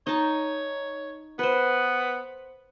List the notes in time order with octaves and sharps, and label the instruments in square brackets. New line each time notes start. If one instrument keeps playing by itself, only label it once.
[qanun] D#4 A5 [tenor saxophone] C#5
[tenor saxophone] B3 [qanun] B4 C5